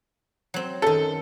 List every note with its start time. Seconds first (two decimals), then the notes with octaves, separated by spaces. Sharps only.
0.54 F#3 C4
0.82 F#2 D#3 A4